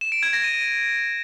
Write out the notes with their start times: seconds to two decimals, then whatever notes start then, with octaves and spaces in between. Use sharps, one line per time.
0.01 E7
0.12 D7
0.23 G#6
0.33 A#6
0.44 D#7